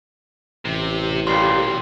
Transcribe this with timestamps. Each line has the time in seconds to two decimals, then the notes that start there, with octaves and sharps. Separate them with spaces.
0.65 A1 C3
1.27 B1 A#2 G3 C6 C7